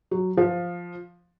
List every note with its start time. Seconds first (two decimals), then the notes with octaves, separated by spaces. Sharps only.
0.11 F#3
0.37 F3